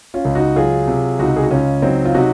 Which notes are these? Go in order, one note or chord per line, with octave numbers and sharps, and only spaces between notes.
C#4 F4
C#2
D#4 F#4
F#3 F4 G#4
C3
C#2 D#4 F#4
G#4
F#4
C#2 C#4 F4
F#3 C4 D#4
F4
C3 D#4 F#4